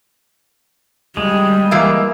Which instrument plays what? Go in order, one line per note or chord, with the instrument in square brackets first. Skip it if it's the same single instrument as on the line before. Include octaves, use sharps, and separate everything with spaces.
[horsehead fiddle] G3 [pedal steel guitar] G#3
[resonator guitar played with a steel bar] E3 A#3 E5